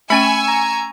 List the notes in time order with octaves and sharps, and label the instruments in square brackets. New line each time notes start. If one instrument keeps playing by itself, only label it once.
[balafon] A3 C#4 G5 [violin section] G#5 C#6 E6 [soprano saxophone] B5
[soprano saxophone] A#5